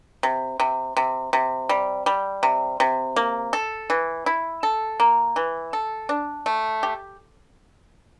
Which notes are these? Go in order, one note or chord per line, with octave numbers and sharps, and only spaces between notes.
C3
C3
C3
C3
G3
G3
C3
C3
A#3
A4
E3
E4
A4
A#3
E3
A4
D4
A3
G4